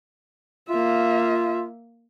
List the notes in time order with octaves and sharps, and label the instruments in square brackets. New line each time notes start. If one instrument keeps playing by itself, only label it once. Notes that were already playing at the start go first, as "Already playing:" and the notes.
[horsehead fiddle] A#3 E5 [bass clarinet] F4